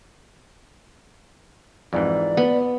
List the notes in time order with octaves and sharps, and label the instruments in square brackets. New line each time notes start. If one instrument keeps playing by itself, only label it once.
[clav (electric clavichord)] F2 G#2 E3 [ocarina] D5
[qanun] B3 B5